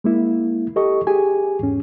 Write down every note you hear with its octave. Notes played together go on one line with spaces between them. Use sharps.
G#3 A#3 E4
G4 A4 D#5 C#6
G4 G#4 G#5
E2 G#2 C#4